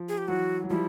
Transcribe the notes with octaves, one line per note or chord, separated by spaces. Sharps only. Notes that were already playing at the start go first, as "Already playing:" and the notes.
Already playing: F3
G#4
G4
E3 F#3 F#4
F#3
F3 G3 E4